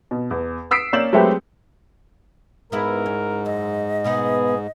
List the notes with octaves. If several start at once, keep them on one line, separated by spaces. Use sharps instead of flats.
B2
E2
D#6 E6 B6 C7 D7
A#3 C#4 D5 G6 E7 F#7
F#3 G#3 A3 C4 G4 B4
G#2 B3 E4 A#4 B4
C#4
F#2 D#5
B2 B3 D#4 G#4